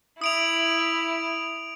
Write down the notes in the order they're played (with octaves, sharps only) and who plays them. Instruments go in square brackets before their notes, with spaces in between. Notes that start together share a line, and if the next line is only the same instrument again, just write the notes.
[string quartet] E4 [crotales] D#6 D7 F7